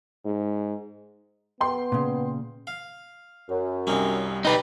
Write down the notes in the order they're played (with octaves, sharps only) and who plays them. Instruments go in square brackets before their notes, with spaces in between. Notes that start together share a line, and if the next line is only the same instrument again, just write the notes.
[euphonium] G#2
[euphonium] B3 [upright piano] G5 C6
[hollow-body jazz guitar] A#2 C#3
[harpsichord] F5
[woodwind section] F#2
[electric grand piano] C2 G3 [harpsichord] C4 C#4 D#4
[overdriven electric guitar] D#4 B4 [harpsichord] G4 D5 G5